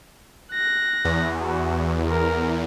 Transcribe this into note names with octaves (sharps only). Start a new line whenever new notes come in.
F#6 A#6
E2
F#4
A#4